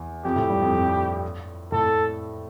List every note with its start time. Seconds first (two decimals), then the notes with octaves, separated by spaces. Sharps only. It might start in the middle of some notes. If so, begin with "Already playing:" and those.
Already playing: E2
0.24 F2 G4
0.36 A2
0.49 G2
0.61 F2
0.73 F2
1.72 A2 A4